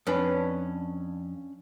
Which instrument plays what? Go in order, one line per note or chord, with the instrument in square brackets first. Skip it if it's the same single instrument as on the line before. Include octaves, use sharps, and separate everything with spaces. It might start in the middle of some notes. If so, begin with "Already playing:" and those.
[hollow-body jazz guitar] F2 [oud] C#4 D4 B4